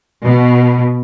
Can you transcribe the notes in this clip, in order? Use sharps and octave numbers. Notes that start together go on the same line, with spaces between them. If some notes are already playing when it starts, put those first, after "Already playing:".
B2